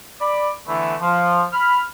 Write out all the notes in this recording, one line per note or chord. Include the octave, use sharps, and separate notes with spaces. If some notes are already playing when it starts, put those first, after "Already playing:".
D5 B5
D3 E3 A3 B3 D4 E4
F3
B5 F6